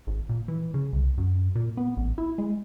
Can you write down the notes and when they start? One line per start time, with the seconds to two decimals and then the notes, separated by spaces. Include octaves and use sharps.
0.07 G#1
0.29 A#2
0.48 E3
0.74 C#3
0.93 C2
1.18 F#2
1.55 A#2
1.77 B3
1.97 A1
2.18 E4
2.38 G#3